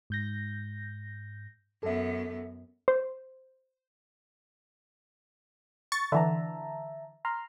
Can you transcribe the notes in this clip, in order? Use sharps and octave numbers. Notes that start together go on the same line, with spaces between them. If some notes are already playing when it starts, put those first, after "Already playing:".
G#2 G6 A#6
F#2 B3 A4 E5
C5
C#6 A6
D3 E3 E5 A5 A#5
A#5 C6 F6